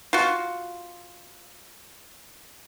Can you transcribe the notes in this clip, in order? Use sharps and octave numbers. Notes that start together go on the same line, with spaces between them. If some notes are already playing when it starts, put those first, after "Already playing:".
F4 F#4